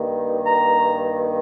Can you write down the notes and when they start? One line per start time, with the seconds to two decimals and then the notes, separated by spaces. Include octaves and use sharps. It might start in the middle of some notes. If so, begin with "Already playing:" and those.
Already playing: G2 D#3 A#3
0.46 A#5